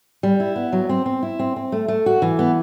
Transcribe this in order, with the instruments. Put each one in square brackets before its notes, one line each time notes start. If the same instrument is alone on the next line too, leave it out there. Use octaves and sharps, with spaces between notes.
[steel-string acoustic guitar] G3
E4
B3
F#3
C4
C4
E4
C4
C4
A3
A3
F#4
E3
B3